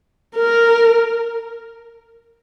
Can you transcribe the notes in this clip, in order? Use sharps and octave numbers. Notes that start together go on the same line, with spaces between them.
A#4